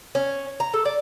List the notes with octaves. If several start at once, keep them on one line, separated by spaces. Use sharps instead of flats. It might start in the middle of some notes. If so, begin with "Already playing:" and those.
C#4
A#5
A4
D5